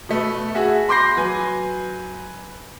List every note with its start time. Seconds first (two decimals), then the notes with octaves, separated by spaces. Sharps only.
0.09 B2 A3 B4
0.55 F#4 G#4 E5 F#5
0.88 B5 C6 D6 G6 A#6 C7
1.17 F#3 B4 G#5